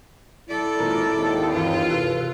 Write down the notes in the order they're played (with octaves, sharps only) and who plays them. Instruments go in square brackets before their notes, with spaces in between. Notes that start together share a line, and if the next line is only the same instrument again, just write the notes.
[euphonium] E4 [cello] A4 D5
[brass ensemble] G#1 A#2 A#4
G#1 D#2
[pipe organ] G2 E3 [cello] F4
[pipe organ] C3 A4 B4